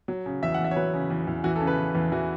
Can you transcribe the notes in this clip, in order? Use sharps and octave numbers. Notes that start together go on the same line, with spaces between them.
F#3
C#3
E2 E5
F#5
E2
E5
C#5
F#3 B4
C#3
E2
E2
E3 F#4
A4
C#3
B4
E2
E2
E3 F#4